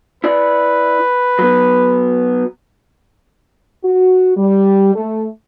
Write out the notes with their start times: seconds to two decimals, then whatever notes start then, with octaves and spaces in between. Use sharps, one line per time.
0.24 E4 B4 D5
1.39 F#3 B3
3.85 F#4
4.37 G3
4.95 A3